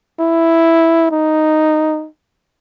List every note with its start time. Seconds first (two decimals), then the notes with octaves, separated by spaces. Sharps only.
0.20 E4
1.11 D#4